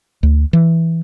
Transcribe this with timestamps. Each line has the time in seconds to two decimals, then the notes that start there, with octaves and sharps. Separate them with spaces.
0.23 D2
0.53 E3